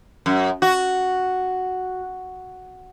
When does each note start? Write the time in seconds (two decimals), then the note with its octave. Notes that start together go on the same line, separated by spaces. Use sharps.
0.26 F#2
0.62 F#4